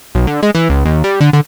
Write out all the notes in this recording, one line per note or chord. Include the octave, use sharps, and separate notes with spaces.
B1
D3
G#3
E3
C#2
D#2
G3
D3
D3